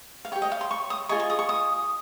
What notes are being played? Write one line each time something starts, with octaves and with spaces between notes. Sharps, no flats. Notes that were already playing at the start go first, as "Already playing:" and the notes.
F5
G4 C#5 G5
D#5
F5
C6
C#6
D#6
F4 G#4 D#5 C#6
C#6
D#6
C#6
D#6